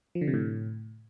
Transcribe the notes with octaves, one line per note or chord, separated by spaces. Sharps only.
F3
D3
C3
A2